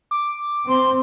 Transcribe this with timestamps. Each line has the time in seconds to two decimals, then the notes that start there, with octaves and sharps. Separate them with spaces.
0.11 D6
0.68 C4 C6